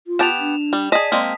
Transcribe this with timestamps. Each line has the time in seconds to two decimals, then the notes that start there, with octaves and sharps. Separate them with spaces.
0.07 F4
0.19 B3 G4 A5 E7 F7
0.39 D4
0.73 G3
0.92 G#4 D5 D#5 A5 D#6 B6
1.12 G#3 A#3 C4